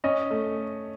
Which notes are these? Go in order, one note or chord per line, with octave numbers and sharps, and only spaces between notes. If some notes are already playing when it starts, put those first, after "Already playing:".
C#4 D#5
A3